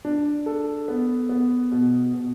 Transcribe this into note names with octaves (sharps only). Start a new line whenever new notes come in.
D4
A4
B3
B3
B2
B2